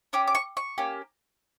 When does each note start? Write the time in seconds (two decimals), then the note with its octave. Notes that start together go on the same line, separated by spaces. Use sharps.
0.13 C#4 G4 D6
0.27 D6
0.35 C#6
0.57 C#6
0.78 A#3 C#4 G4